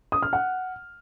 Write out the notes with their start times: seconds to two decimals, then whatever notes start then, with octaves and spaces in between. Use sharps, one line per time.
0.12 D#6
0.22 F6
0.33 F#5